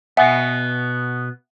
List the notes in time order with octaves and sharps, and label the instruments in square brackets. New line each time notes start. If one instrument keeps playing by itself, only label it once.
[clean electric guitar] B2 B3 [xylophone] E5 F#5 G#5